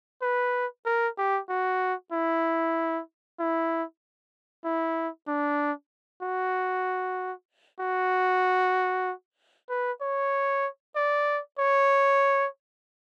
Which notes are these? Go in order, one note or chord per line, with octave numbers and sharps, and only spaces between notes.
B4
A#4
G4
F#4
E4
E4
E4
D4
F#4
F#4
B4
C#5
D5
C#5